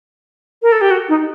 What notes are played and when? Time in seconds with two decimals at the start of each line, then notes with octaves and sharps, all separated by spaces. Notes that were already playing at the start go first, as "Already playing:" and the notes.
0.62 A#4
0.72 A4
0.81 G4
0.91 F#4
1.09 D#4